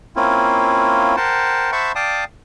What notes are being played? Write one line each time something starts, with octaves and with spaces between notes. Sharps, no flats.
A#3 C4 C#4 E4 F4
A#4 C5 F#5 G5 A5
C5 E5 F#5 A5 B5 C#6
D5 F5 G5 A5 D6 D#6